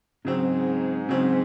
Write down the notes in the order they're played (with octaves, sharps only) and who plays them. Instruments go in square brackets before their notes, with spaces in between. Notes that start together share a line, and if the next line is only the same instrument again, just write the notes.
[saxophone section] G#2 [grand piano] C#3 F#3 C4
[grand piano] C#3 F#3 C4